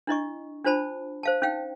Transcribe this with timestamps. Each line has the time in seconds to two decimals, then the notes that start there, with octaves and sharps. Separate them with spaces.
0.07 D4 E4 D#5 C#6
0.65 D4 F4 C5 A5 B5
1.23 C5 F5 A5
1.42 C#4 D#4 F5 G5